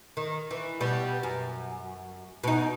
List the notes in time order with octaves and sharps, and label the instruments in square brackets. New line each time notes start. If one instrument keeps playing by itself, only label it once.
[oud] D#3
E3
B2 G3
F#2
B2 D#4